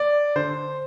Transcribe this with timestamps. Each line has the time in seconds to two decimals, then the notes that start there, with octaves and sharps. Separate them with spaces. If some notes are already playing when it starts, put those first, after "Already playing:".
Already playing: D5
0.36 D3 C5